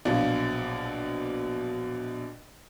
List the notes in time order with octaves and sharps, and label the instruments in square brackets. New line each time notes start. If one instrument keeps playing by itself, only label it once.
[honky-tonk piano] A#1 B2 F#3 D4 F4